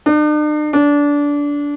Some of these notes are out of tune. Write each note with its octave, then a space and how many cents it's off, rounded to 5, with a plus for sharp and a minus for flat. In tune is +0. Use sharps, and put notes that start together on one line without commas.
D4 +45
D4 -20